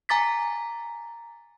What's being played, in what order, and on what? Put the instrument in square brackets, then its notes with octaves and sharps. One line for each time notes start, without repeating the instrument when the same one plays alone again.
[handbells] G#5 A#5 D6 A6 B6